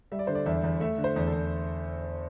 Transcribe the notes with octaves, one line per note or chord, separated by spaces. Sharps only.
G3 E5
D5
D3 C5
D5
E2 E5
E2
A3 E5
D3
C5
E2
A4
E2